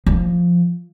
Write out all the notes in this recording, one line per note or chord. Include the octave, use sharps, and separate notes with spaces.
F3